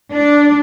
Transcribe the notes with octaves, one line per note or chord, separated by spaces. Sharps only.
D4